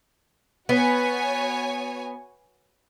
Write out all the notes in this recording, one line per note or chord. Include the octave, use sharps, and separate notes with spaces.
B3 F#4 C#5 G#5